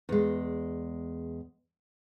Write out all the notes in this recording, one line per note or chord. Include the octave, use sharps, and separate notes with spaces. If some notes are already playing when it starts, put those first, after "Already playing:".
E2 G#3